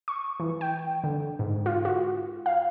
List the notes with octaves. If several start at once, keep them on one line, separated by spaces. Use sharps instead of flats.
C#6
E3
G5
D3
G#2
F4
F#4
F5